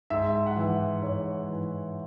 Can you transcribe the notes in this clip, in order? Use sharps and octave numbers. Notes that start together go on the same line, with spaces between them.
G#2 E5
F#5
E3 E5
G#2 C#5
E3